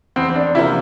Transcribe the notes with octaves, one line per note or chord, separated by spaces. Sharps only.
E2 C4
C4
D4
C3 F3 A#3 E4